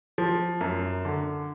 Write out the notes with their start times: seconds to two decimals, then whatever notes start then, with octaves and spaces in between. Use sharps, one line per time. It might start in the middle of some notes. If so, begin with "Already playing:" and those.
0.18 F3
0.61 F#2
1.05 D3